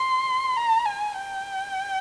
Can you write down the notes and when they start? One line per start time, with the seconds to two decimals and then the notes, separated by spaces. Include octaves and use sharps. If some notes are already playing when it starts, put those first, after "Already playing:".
Already playing: C6
0.57 A#5
0.85 G#5
1.14 G5